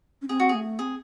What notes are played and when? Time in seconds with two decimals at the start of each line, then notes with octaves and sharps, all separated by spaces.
0.22 C#4
0.29 C4 G#4
0.40 F#4
0.49 G#4
0.54 A3
0.79 C4 G#4